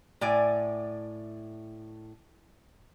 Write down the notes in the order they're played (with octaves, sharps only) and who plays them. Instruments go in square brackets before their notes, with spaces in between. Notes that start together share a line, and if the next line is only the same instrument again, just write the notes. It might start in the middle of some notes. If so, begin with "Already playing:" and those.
[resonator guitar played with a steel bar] A2 D5 G#5